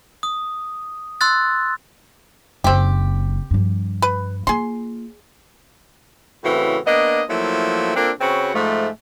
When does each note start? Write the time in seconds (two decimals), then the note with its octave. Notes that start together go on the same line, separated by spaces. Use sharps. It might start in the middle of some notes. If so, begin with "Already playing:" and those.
0.23 D#6
1.21 C6 E6 F#6 A6
2.64 F#1 C4 D#4 G4
3.51 G2 F3
4.02 B4
4.47 A#3 F4 G#4 C6
6.44 A2 C#3 E3 C4 F#4
6.86 A#3 B3 D4 D#5
7.29 F3 F#3 A3 A#3 E4
7.96 A#3 C4 D4 F4 A4
8.20 C#3 C4 F#4 B4 C#5
8.55 G#2 F3 A3